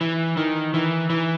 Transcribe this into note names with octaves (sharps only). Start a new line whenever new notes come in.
E3
D#3
E3
E3